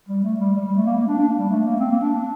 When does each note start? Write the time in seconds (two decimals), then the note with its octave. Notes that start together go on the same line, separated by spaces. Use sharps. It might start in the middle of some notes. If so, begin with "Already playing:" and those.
0.09 G3
0.24 A3
0.40 G3
0.56 G3
0.66 G3
0.76 A3
0.86 A#3
0.97 A#3
1.08 D4
1.19 D4
1.29 A#3
1.39 G3
1.50 A3
1.65 A#3
1.80 C4
1.91 A#3
2.01 D4